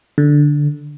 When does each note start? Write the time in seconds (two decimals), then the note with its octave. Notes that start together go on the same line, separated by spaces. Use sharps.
0.18 D3